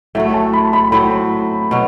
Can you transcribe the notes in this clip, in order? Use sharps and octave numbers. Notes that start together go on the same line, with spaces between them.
A2 F#3 A3 E5
A5
B5
B5
A2 F#3 C4 B5
B2 F#3